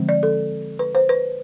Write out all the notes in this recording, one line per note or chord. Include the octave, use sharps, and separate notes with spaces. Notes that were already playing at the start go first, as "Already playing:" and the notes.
Already playing: D3 F3 G#3 C4
D5
A4
B4
C5
B4